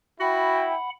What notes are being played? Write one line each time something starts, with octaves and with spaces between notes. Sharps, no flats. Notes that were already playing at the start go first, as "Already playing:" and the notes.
E4 F#4 F#5 G5 B5